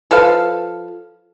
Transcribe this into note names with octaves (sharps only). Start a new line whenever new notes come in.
F3 A4 B4 F5